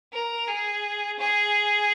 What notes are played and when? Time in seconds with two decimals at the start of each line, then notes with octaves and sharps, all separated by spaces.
0.13 A#4
0.48 G#4
1.19 G#4